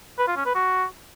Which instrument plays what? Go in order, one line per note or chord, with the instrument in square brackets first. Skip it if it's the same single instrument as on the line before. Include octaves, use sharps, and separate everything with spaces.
[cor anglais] B4
F4
C#4
B4
F#4